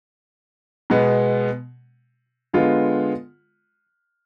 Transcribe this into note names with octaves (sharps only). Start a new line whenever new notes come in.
B2 G#3 B3
D3 G#3 B3 F4